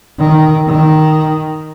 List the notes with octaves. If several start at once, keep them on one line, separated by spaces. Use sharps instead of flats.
D#3
D#3